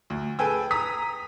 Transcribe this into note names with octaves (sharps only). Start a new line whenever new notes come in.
D2
G#4 A4 B4 G5 G#5 E6
A#5 D#6 B6